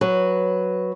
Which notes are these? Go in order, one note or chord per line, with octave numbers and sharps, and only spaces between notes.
F#3 B4